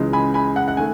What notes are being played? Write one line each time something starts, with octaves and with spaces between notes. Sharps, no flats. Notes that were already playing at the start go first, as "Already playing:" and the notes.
Already playing: C#2 C#3 E3 G#3
G#5 B5
G#5 B5
F#5
F#5
D#3 A3 G#5